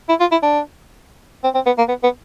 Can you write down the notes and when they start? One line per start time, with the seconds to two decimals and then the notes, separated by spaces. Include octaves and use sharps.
0.09 E4
0.21 F4
0.32 E4
0.43 D4
1.44 C4
1.55 C4
1.66 B3
1.78 A#3
1.88 B3
2.03 B3